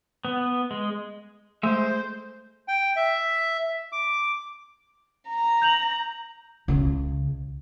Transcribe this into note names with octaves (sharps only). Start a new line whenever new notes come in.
B3
G#3
G#3 A3 C5 E5
G5
E5
D6
A#5
G6 F7 F#7
C#2 C#3